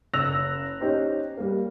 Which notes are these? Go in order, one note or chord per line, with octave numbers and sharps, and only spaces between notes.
F#1 E6 F#6 A#6 F7
C#4 D#4 G4 C5
G3 A#3